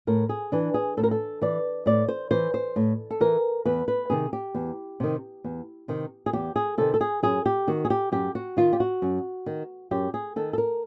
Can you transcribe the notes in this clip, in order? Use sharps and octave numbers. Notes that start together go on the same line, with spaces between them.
A2 A#4
G#4
E3 D4
G#4
A2 A4
A#4
A4
E3 D5
A2 D5
C5
E3 C5
C5
A2
A4
E3 A#4
E2 B4
B4
C3 D#3 G#4
G4
E2
C3 D#3
E2
C3 D#3
G#4
E2 G4
G#4
C3 D#3 A4
A4
G#4
F#2 G#4
G4
D#3 F#4
G#4
G4
F#2 G4
F#4
D#3 F4
G4
F#4
F#2
D#3
F#2 G4
G#4
D#3 A4
A4
A#4